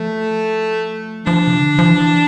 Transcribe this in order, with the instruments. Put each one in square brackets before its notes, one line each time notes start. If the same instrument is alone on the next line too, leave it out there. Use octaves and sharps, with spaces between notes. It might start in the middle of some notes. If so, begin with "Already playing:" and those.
Already playing: [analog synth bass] F3 [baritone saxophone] A3
[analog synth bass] F3 [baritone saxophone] D4
[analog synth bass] C3
D3
F3
E3